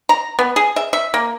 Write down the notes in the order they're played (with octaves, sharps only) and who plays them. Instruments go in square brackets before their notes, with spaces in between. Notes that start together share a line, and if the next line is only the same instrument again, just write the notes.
[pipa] A#5
B3
G#4
E5
E5
A#3